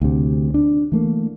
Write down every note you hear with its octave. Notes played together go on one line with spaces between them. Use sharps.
D2 C3
D4
E3 A3 A#3